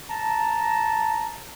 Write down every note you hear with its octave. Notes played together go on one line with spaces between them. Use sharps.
A5 A#5